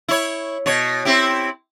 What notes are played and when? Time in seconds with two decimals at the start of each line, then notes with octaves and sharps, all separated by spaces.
0.09 E4 C#5
0.66 B2 C#5
1.05 C4 E4 G4